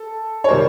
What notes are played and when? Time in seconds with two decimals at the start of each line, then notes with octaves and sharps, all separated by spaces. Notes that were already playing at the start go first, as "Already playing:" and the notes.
Already playing: A4
0.44 C#5
0.48 C3 D#3 G3 A#4 C5